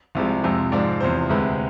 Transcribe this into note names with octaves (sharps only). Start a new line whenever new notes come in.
C2 C3 F3 G#3
F2 C3 G#3
G#2 F3 G#3 D5
E2 C3 F3 C5
D2 C3 G#3 B4